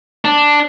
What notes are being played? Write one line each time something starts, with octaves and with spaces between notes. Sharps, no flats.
D4